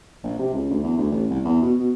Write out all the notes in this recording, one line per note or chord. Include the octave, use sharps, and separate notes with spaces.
A#1
C3
C#2
D2
E2
D2
A1
C2
E2
B2
B2